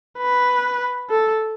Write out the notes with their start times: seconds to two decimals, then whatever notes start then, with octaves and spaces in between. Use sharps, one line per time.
0.18 B4
1.10 A4